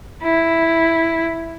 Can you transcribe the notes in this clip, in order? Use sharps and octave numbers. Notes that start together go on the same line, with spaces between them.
E4